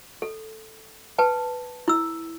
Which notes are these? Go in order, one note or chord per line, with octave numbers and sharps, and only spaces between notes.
A4
B4 G5 A5
E4 E6